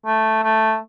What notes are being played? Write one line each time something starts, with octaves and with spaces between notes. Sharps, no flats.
A3
A3